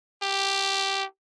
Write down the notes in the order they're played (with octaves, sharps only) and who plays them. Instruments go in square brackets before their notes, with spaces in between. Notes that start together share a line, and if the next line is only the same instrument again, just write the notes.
[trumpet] G4